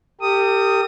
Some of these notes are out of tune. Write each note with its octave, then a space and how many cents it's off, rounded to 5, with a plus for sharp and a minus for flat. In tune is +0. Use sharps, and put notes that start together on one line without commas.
G4 +0 A#4 -45 D#6 +0